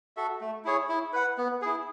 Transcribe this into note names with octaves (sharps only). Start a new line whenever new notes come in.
F#4 A4 E5
A3
E4 G#4 C#5
E4
B4 F#5
B3
E4 G#4